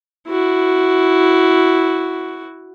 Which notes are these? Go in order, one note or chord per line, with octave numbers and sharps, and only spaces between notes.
E4 F#4